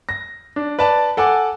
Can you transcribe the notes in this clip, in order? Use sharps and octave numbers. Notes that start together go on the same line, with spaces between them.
A#6
D4
B4 D5 A5
A4 F#5 G#5 D6